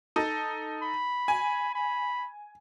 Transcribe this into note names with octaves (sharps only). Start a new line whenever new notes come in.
D#4 A4
B5
G#5
B5